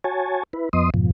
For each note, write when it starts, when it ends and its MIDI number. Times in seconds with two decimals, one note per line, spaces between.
0.04 0.43 66
0.04 0.43 73
0.04 0.43 80
0.04 0.43 81
0.53 0.69 64
0.53 0.69 71
0.73 0.90 41
0.73 0.90 53
0.73 0.90 59
0.73 0.90 75
0.73 0.90 84
0.73 0.90 87
0.94 1.11 41
0.94 1.11 44
0.94 1.11 47
0.94 1.11 53